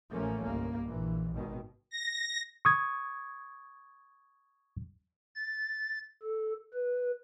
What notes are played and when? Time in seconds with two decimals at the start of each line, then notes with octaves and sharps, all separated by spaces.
0.12 A1 A2 F3 A3 A#3 C#4
0.41 G1 C2 A#3
0.87 A#1 E3
1.33 G#1 B2 D#3
1.90 A#6
2.65 C#6 D#6 G#6
5.36 A6
6.22 A4
6.73 B4